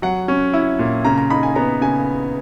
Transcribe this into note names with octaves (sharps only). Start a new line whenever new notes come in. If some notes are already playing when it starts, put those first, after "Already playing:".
F#3 F#5
C#4
E4
A#2
C#3 A#5
A#5
D#4 B5
G#5
B3 A#5
C#3 G#5